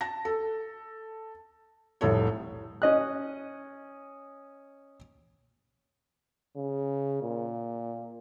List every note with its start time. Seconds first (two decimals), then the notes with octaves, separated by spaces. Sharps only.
0.01 A5 A#6
0.25 A4
2.01 F1 C2 A2 A4 C#5
2.82 C#4 D#5 F#6
6.56 C#3
7.22 A#2